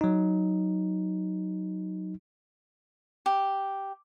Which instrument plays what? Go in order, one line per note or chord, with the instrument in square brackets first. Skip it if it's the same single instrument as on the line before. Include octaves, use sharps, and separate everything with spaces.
[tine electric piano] F#3 D#4
[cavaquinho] G4